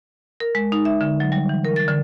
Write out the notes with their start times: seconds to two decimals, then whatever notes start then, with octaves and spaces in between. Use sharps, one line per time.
0.40 A#4
0.55 G#3
0.72 D#4
0.85 E5
1.01 D3
1.20 F#3
1.32 G3
1.49 E3
1.65 A#4
1.76 A6
1.88 D3